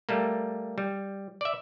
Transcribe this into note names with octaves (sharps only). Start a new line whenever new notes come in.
G3 A3 A#3
G3
D5 E5